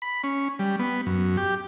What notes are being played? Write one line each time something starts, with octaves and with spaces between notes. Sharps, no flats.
B5
C#4
G3
B3
F#2
G4